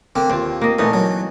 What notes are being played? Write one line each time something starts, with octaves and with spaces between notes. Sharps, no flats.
D3 A#3 C4
D#2 C4 F4
A#3 D#5
A#2 E3 A3 D#4
F#3